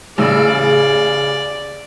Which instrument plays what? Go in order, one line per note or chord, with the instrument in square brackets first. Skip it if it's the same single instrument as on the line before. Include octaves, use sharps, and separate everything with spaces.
[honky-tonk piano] A1 C#3 E6 [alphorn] G#4 [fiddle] D5